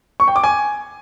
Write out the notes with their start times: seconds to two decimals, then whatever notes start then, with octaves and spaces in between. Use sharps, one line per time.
0.20 C#6
0.28 G5
0.36 D6
0.44 G#5